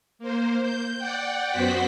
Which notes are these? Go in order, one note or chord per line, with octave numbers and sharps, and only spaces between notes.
A#3 C5
G6
D5 F#5 G5
F#2 B3 F#4 C5 F#5 B6